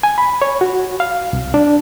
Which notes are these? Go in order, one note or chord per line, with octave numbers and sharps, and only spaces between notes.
G#5
B5
C#5
F#4
F5
C2
D4